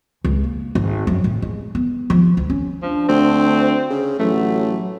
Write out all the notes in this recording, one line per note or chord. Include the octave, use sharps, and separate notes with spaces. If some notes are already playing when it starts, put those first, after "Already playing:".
C#2
A#3
G#1
F#2
A2
G#3
B3
F3
D2
C#4
F3 D4
D2 C4
C#3
A1 F#3 A3